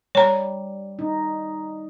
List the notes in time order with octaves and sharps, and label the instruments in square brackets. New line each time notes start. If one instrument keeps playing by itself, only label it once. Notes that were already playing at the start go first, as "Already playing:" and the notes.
[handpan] G3 [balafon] C#5 A#5
[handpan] D#4